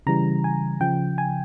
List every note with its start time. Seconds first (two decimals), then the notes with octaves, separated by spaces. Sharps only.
0.07 C#3 E3 G3 A#5
0.44 G#5
0.81 C#3 F3 G5
1.18 G#5